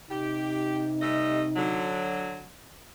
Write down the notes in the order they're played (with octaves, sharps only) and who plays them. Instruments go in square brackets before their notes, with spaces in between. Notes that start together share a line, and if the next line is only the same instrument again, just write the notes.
[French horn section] C3 D#4 [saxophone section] G4
[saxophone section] G3 A3 D#5
D3 F#3